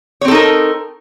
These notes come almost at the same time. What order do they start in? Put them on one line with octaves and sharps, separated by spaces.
C#5 C4 A4 D#4 A#4